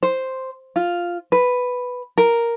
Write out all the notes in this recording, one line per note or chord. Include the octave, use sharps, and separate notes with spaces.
C5
F4
B4
A#4